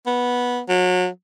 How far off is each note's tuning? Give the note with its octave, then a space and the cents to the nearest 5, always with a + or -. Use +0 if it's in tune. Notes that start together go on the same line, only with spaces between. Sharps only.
B3 -10
F#3 -30